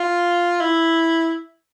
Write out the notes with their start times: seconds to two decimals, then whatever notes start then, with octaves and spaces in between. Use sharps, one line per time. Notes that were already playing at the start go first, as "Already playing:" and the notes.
Already playing: F4
0.61 E4